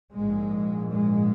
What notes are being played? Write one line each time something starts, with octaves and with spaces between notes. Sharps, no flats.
A#1 G#2 G#3
G#3